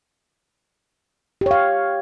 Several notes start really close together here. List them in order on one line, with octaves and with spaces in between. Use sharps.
G4 C#5 F5